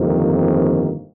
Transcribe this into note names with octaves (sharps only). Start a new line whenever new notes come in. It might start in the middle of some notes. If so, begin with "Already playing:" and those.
Already playing: G1 F2 C3 D#3 A#3